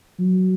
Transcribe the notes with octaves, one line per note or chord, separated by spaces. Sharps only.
F#3